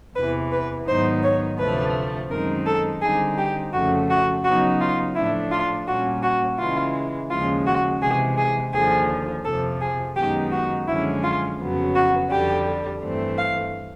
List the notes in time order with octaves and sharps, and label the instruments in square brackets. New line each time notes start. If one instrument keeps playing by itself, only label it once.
[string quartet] E2 C3 E3 B4
B4
G#2 D#3 F#3 B3 D#4 C5
C#5
D2 C3 F3 A3 B4
F#2 D#3 G#3 C4 D#4 A#4
A4
D3 G3 C4 D#4 G#4
G4
F2 C#3 F3 A3 F#4
F#4
C#3 F#3 B3 D#4 F#4
F4
A2 F3 A3 D4 E4
F4
A#2 G3 A#3 C#4 F#4
F#4
C#3 E3 G#3 F4
D#2 C#3 F3 G#3 F4
F#4
C3 E3 G#3 G#4
G#4
D#2 D3 F3 G#4
F2 C3 F3 A4
G#4
F#2 D#3 G#3 B3 D#4 G4
F#4
F#2 D3 F3 G#3 C#4 E4
F4
F2 C#3 F#3 B3
F#4
F2 D3 G3 G4
G2 E3 A3 C4
F5